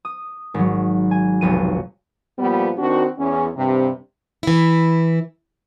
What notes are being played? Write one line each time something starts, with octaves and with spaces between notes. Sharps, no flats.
D#6
G#1 F#3
G#5
F1 B1 D#7
A#2 F3 G3 B3
D#3 C4 D4 F#4
E2 C#4
G2 C3
E3 E4